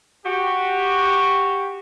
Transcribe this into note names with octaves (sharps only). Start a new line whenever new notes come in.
F#4 G4